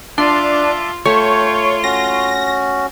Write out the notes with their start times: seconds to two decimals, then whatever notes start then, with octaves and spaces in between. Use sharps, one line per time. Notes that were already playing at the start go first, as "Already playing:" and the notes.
0.18 D4 F4 E5 A5 C6 D6
1.05 A3 F4 C#5 G5
1.84 C#4 F#4 A#6